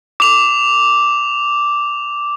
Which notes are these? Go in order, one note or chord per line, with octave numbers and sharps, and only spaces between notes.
D6 F7